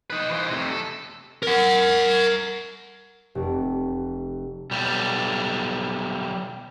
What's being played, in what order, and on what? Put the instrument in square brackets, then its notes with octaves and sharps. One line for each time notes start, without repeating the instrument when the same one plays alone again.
[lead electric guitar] D#4 B4
E3 C5
C3 A3
A4
A#4 F#5
[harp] F1
[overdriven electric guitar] B1 G3